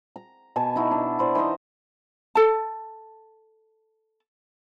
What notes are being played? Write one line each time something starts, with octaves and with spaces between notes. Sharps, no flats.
A#5
B2 G#5 A5
D#4 E4 F#4
D4
E4 C5 D5
E3 D#4 C5 D#5
A4 A5